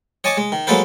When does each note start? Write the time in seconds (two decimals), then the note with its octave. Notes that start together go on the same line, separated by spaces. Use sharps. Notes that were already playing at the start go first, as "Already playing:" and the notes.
0.24 C#5 D#5 G#5 A5 C#6 D6
0.37 G#3
0.52 D#3
0.67 F#3 G#3 A#3 A4 B4 C5